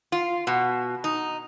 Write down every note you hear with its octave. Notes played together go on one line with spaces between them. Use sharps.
F4
B2
D#4